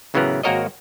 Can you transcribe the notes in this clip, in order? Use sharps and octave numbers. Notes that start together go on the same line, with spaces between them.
A1 C#3 E3 F#3 B3 A#4
G#1 A#3 F#4 A#4 C#5 D#5